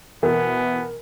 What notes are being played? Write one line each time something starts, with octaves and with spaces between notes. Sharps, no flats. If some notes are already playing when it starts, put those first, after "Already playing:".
B2 E3 B3 A#4